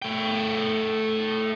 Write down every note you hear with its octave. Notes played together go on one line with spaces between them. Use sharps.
A3 G5